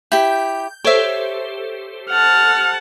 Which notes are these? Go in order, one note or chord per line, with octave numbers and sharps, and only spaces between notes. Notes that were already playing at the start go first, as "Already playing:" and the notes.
E4 G4 G6
G4 A4 C5 C#5 E5
F#5 A5 F6